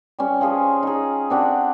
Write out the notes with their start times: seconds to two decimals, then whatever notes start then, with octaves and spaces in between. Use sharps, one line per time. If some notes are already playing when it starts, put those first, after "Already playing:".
0.19 G3 C#4
0.41 F3 F4 G#4 C#5
0.83 D#4 G#4
1.30 C4 D4 F#4 G4